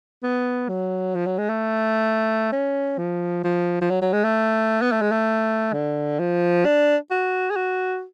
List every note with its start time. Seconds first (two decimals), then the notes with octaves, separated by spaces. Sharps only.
0.23 B3
0.69 F#3
1.15 F3
1.26 F#3
1.38 G#3
1.49 A3
2.52 C#4
2.98 F3
3.44 F3
3.81 F3
3.90 F#3
4.02 F#3
4.13 G#3
4.24 A3
4.82 B3
4.92 A3
5.02 G#3
5.12 A3
5.73 D3
6.20 F3
6.65 D4
7.11 F#4
7.50 G#4
7.56 F#4